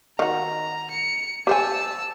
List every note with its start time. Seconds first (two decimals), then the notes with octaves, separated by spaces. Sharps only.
0.19 D#3 F#4 A#5
0.91 C#7
1.47 G4 C5 G#5 A5 E6